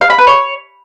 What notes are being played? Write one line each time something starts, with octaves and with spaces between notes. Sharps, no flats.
F5
B5
B4
C#5